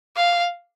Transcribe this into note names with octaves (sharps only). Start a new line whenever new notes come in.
F5